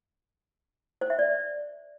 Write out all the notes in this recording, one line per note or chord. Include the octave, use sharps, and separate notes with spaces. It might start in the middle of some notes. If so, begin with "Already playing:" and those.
C5
E5
D5